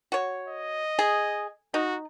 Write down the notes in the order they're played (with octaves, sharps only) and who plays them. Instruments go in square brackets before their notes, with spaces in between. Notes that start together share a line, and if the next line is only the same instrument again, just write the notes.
[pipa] F#4 C#5
[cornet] D#5
[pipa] G#4
[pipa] D#4 [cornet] F#4